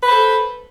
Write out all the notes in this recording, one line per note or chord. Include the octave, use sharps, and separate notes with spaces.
A4 B4 C5